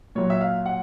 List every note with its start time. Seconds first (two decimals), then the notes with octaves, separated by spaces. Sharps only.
0.15 A#2 F#3 C#5
0.30 E5
0.41 F5
0.66 F#5